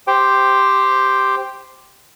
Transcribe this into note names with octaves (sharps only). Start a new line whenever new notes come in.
G4 C5 G5